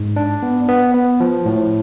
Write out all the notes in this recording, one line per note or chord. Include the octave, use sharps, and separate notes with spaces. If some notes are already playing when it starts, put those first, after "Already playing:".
Already playing: G#2
D4
B3
B3
B3
F3
A2